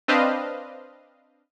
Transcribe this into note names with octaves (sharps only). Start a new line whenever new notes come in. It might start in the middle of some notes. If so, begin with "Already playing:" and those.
C4 D4 B4 C5 D#5 F5